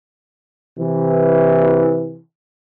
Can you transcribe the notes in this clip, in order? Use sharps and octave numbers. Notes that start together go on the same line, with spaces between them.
C3 E3